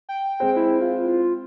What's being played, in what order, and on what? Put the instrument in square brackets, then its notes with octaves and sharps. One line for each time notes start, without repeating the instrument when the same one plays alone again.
[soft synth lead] G5
[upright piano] G#3 C4
[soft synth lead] E4
F4